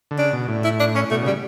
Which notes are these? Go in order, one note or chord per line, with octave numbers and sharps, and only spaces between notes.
D3
C#3 D4
B2
A2
E4
D4
C#4
B2 A3
C#3 G3